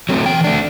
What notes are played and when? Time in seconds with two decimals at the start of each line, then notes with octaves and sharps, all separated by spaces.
0.09 F#3 A3 C4
0.26 E3 G5
0.44 A3 D4